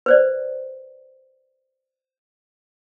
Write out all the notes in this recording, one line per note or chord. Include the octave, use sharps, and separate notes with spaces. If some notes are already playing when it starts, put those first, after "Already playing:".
B4 C5 D5